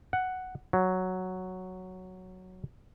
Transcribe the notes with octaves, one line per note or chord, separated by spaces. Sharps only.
F#5
F#3